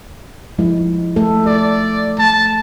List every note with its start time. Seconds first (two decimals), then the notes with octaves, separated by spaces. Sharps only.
0.59 F3 G#3 E4
1.16 A3 A4
1.46 A4 D5
2.19 A3 A5